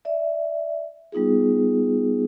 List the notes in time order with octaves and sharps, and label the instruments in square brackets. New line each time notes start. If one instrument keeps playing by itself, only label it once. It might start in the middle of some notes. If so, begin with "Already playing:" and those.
[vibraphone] D5 E5
G3 B3 D#4 F4 G#4